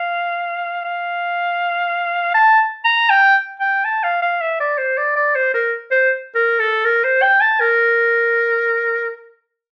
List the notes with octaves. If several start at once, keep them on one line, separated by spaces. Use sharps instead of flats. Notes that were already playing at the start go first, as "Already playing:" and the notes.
Already playing: F5
F5
A5
A#5
G5
G5
A5
F5
F5
E5
D5
C5
D5
D5
C5
A#4
C5
A#4
A4
A#4
C5
G5
A5
A#4